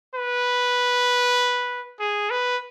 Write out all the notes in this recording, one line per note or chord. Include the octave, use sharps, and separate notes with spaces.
B4
G#4
B4